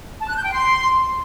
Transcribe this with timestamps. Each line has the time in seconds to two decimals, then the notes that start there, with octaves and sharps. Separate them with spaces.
0.21 A5
0.29 F#6
0.36 G6
0.44 G5
0.52 C6